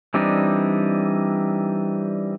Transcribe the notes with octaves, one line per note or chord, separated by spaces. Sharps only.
E3 G3 C4 D4 D#4